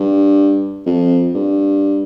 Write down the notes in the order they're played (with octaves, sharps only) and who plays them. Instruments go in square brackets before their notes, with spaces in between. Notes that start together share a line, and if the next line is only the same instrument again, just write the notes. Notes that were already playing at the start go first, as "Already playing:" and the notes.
Already playing: [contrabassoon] G2
F2
G2